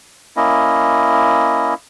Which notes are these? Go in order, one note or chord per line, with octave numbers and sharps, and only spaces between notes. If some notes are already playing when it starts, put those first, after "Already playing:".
A#3 C#4 E4 D#5